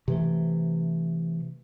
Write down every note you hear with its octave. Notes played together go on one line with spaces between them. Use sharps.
C3 E3 A3